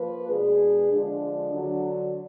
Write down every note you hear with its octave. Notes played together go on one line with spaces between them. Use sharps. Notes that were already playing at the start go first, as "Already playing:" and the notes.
Already playing: F3 A#3 F4 B4
B2 G#3 D4 G#4
D3 F3 G#3 D4
D3 F#3 D4